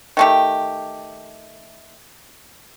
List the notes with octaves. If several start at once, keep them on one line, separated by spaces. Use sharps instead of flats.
D#3 A3 G4